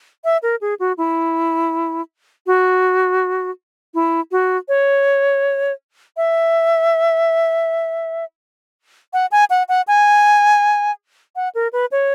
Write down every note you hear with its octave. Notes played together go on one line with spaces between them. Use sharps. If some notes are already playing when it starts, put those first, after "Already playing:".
E5
A#4
G#4
F#4
E4
F#4
E4
F#4
C#5
E5
F#5
G#5
F#5
F#5
G#5
F#5
A#4
B4
C#5